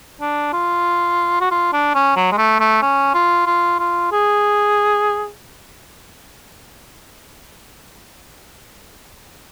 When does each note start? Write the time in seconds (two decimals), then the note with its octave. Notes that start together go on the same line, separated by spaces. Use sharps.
0.21 D4
0.53 F4
1.41 F#4
1.51 F4
1.73 D4
1.95 C#4
2.16 F#3
2.32 G#3
2.38 A3
2.60 A3
2.82 C#4
3.14 F4
3.46 F4
3.79 F4
4.12 G#4